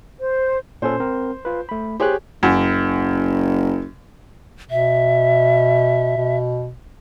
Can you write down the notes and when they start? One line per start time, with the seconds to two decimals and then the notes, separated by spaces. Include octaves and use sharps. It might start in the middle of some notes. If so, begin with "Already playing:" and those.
0.20 C5
0.82 A#2 C#4 A4 C5
1.00 C4 A#4
1.45 F4 B4
1.69 A3 B5
2.00 G4 G#4 C5 C#5 F#6
2.43 F#1 F#2
4.71 B2 E5
6.17 B2